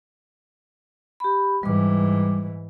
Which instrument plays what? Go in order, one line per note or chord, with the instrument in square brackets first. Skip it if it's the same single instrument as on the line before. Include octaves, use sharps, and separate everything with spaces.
[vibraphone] G4 B5
[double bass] G#2 E3 [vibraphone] G3 D6